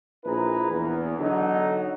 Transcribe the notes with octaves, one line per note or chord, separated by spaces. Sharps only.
A#1 E4 G#4 B4 A#5
E2
D3 F#3 D#4